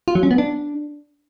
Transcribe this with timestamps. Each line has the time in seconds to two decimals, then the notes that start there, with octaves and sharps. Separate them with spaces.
0.08 F4
0.15 F#3
0.23 C#4
0.31 B3
0.38 D4